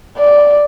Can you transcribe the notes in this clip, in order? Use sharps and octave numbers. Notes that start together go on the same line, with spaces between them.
D5